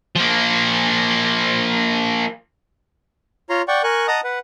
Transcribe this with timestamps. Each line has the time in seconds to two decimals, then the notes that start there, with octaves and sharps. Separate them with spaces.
0.16 F3 A#3
3.50 F4 C#5 A#5 C6
3.68 D5 F#5 G5 C#6
3.83 A#4 G#5 C#6 F#6
4.08 D#5 F#5 A5 A#5 D#6
4.24 B4 F#5